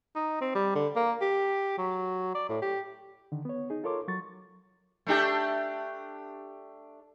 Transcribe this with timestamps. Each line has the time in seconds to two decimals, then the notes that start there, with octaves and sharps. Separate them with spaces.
0.16 D#4
0.41 C4
0.55 G3
0.75 D3
0.96 A#3
1.21 G4
1.78 F#3
2.35 D5
2.49 A2
2.62 G4
3.32 D3 D#3
3.45 B3 C#5
3.70 D#4 G#4
3.84 F4 A4 A#4 C#5 C6 D6
4.08 F#3 C#6 A6
5.07 A3 D4 G4